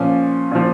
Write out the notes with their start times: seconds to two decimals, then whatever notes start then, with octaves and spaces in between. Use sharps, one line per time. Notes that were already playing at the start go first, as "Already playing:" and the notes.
Already playing: A#2 F3 C#4
0.51 A#2 F3